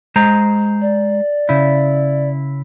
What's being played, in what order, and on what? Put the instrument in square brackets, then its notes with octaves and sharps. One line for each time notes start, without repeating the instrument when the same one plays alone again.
[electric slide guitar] G#3 C5 A#5
[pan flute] D5
[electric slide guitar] C#3 E4